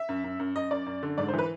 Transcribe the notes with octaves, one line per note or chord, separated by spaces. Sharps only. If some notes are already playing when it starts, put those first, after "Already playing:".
Already playing: E5
F#2
F#2
F#2
F#2 D#5
F#2 D5
F#2
D3
G#2 D5
C5
E3 B4